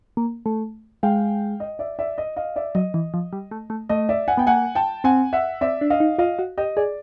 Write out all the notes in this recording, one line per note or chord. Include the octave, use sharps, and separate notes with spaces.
A#3
A3
G#3 F5 G5
D#5
D5 E5
D5 E5
D#5
D#5 F5
D5 E5
F#3 D#5
E3
F3
G3
A3
A3
A3 D#5
D5 E5
F#5 G#5
B3 G5
A#3 F#5 G#5
G5 A5
C4 F#5 G#5
E5 F#5
C4 D5 E5
D4
D#5 F5
D#4
F4 D#5 F5
F#4
G4 D#5
G#4 D5